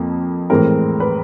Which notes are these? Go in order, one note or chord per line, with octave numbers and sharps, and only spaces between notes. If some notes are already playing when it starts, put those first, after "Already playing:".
Already playing: F2 F3 A#3
A2 E3 G#3 C4 A#4
B4